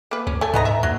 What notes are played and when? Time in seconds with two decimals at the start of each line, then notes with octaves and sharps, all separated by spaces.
0.11 A#3 B4
0.27 D2 C#4
0.41 A3 A4 G#5
0.54 G#2 B3 D#5 A#5
0.65 E5
0.83 D#2 F#3